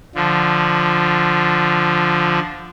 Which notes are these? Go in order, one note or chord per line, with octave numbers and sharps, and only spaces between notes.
D3 F3